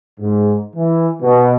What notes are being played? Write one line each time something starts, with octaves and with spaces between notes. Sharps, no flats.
G#2
E3
B2